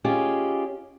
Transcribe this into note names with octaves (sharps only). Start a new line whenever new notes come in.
C#4 F4 G4 G#4 D#5